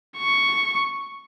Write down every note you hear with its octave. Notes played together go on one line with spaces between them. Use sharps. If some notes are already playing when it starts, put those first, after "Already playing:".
C#6